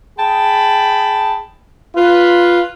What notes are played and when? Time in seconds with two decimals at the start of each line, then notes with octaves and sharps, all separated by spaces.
0.19 G#4 G5 A5 B5
1.96 F4 B4